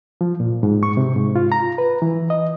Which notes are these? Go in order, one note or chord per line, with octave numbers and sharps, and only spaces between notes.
F3
A#2
G#2
C#6
C3
G#2
F4
A#5
B4
E3
D#5